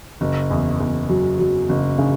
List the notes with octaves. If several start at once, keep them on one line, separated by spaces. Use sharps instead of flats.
F#1
E2
E2
F#3
F#3
F#1
C#3